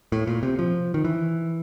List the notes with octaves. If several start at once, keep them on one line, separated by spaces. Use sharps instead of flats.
A2
A#2
C3
F3
D#3
E3